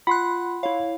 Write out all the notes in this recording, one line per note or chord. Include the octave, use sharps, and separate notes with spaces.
F4 F#5 B5 C6 F#6
E4 C#5 F5